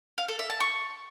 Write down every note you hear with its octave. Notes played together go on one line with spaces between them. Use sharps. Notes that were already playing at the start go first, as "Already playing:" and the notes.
F5
A4
E5
A5
C#6